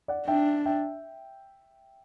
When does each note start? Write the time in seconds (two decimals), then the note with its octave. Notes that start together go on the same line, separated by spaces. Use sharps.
0.08 D5 F#5
0.27 D4 E5 G5
0.65 E5 G5